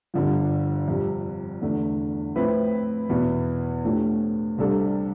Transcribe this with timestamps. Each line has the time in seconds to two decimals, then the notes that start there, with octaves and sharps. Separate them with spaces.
0.14 G1 G2 D3 F3
0.88 F2 C3 G3
1.61 E2 D3 A3 D4
2.35 A2 F3 C4 E4 B4
3.10 E2 B2 B3 E4
3.84 A2 F3 A3 D4 G4
4.58 C2 C3 G3 D4 A4